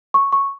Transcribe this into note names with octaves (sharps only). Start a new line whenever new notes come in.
C#6
C#6